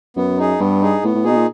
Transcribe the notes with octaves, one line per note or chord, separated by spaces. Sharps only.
F#2 B3
D#4 G#4
G2 B3
D#4 G#4
A2 B3
A2
A#2 D#4 G#4
B2
A#2